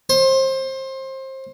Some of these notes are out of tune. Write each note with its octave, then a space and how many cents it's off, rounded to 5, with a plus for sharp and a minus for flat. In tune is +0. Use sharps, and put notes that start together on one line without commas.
C5 +25